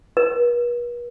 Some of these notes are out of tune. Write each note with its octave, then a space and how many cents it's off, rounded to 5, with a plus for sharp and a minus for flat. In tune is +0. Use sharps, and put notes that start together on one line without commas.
B4 -45